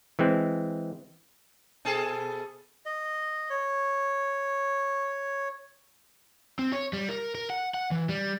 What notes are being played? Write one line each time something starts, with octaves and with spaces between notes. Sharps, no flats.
E3 G#3 C4
B2 G#4 A4
D#5
C#5
C4
C#5
G3
A#4
A#4
F#5
F#5
E3
G3